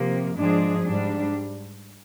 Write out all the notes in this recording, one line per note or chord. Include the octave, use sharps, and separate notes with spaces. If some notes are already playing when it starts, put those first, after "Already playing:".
Already playing: C3 F3 A#3
G#2 F3 G#3 D4 G#4
G#2 G3 D4